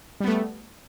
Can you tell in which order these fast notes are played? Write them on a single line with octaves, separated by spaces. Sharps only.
G3 B3 A3